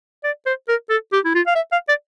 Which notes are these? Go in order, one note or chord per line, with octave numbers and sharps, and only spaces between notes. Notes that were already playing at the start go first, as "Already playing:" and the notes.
D5
C5
A#4
A4
G4
E4
F4
F5
E5
F5
D5